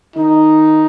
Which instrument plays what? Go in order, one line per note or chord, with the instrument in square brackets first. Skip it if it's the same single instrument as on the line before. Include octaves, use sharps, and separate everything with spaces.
[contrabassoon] D#3 [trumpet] D#4